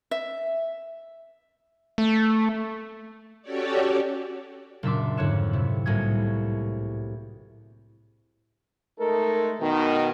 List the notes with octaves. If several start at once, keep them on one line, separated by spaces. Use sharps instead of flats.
E5
A3
C#4 F#4 G4 A4 C#5 D5
F#1 A#2 D4 E5 C6 D6
F2 G#2 D3 C#5 F#6 E7
C3 E4
C2 A2 A#3 F#4 G#4 G#6
G#3 A3 D#4 A4 A#4
B2 D#3